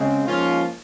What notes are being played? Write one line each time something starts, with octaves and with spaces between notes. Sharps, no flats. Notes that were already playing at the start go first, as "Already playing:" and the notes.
Already playing: C#3 G#3 C4
G#2 F3 A#3 C#4 F4